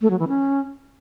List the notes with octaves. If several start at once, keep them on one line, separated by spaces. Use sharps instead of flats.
A3
F#3
E3
C#4